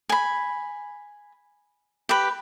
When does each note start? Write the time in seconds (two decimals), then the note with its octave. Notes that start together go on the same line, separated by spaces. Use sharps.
0.09 G#5 B5
2.09 G4 B4